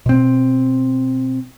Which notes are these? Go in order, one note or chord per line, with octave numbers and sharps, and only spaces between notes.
B2 C4